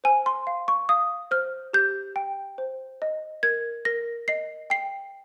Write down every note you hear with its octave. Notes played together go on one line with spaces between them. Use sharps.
C5 G#5
C6
F5
C#6
F5 D#6
C5 F6
G4 G6
G5
C5
D#5
A#4 G#6
A#4 A#6
D#5 C7
G5 C7